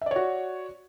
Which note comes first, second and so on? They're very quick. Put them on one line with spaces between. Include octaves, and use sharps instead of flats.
E5 D5 C#5 F#4